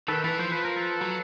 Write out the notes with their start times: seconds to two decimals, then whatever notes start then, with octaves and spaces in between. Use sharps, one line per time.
0.08 D#3 A4 B4
0.24 E3 A4 B4
0.39 F3 C5
0.52 B4
0.65 A#4
0.77 A4 B4
1.01 F#3